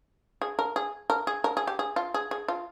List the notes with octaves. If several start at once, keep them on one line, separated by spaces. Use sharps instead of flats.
G#4
A#4
G#4
A#4
G#4
A#4
G#4
G4
G#4
F4
G#4
G#4
F4